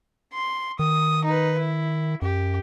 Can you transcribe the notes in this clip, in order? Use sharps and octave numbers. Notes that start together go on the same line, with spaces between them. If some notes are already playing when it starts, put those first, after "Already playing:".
C6
D#3 D#6
D#4 B4
E4
F#2 G4